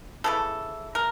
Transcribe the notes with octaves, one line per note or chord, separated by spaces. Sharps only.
C#3 E3 A3 A4
A#4